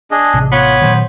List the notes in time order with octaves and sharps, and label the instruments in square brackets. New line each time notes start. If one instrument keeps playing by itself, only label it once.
[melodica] D4 G#4 D#5
[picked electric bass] A1 C3
[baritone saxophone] B3 [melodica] F4 [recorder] C#5
[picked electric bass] A#2 D#3 F#3 [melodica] C5